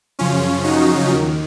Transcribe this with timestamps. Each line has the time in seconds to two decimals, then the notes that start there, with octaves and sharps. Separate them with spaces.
0.19 F#2 C#3 F3 C#4 F4
0.64 D#4 F#4
1.10 D#2 D#3